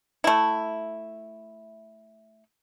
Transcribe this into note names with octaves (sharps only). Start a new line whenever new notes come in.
A3 E4